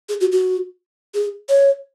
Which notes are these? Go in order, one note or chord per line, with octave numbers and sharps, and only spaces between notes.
G#4
F#4
F#4
G#4
C#5